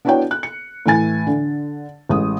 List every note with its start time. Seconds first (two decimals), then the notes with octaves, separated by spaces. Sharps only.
0.05 B3 D4 E4 F#4 C#5 G5
0.31 F#6
0.43 C#7
0.86 A2 E3 E4 G#5 A6
1.27 D3
2.09 A1 G#3 D#6